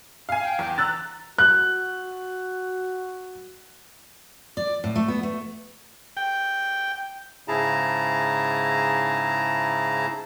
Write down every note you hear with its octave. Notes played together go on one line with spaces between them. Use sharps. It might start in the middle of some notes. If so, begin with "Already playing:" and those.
F5 G#5
G5
E2
A#5 E6 F#6 A6
F#4 F#6
D5
A2
A3
B3
A3
G5
G#2 C#3 E4 G#4 A5 A#5